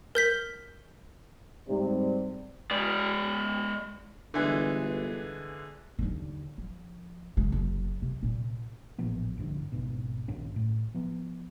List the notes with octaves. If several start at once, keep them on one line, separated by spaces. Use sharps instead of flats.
A#4 G6 B6
G#2 C3 G3
G#3 D5
G1 D3 E3 G#3
D#2 D3
F3
C#3 G#3
F#1
C3
A#2 C#4
A1 A#2 F3 B3
C2 G2 D3 F3
G#1 C#2 G#2 B2
A#1 G2 D#3 C#4
A2
F3 B3